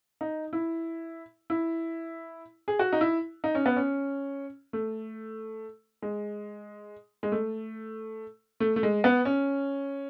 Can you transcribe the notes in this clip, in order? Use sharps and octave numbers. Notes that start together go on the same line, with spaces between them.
D#4
E4
E4
G#4
F#4
D#4
E4
D#4
C#4
B3
C#4
A3
G#3
G#3
A3
A3
A3
G#3
B3
C#4